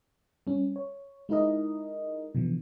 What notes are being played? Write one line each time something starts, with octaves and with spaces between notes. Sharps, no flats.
G3 C#4
C#5
G#3 D#4 E4 A#4 D#5
B2 D3 E3 F3